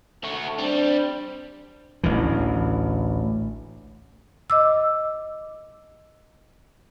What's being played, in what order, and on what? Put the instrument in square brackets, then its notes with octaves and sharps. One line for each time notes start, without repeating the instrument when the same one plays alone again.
[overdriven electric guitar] A3 F#4
[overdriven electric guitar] G3 [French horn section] C4 D4
[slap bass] A1 D2 E3
[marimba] D#5 D6 E6